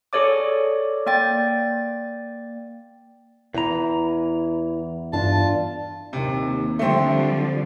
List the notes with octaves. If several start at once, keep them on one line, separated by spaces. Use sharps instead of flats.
G#4 A4 C#5 D5 D6
A#3 D5 G5 A6
E2 E3 A#5
G2 D4 F4 A5
D#2 C3
D3 F3 G3 A3 C4